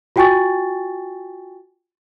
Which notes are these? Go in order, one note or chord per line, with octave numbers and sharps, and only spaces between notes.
F4 F#4 G5 G#5 C#6 A6